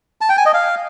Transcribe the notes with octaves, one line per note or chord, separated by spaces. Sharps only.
A5
G5
G#5
D#5
F5